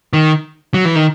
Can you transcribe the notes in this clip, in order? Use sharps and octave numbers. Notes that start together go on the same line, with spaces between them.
D#3
F#3
E3
D#3